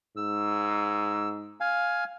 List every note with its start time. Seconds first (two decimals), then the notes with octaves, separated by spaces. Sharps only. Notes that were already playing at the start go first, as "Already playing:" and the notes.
0.17 G#2 E6
1.60 F5 G#5